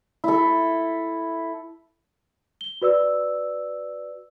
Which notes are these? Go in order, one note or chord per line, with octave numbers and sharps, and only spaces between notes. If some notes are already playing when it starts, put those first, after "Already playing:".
E4 A4
G7
F#4 B4 D5 E6